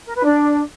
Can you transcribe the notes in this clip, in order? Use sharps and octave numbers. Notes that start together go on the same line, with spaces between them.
A#4
B4
D4